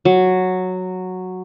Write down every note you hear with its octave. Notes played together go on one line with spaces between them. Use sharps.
F#3